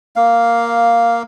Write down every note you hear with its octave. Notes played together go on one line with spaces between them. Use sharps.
A#3 F5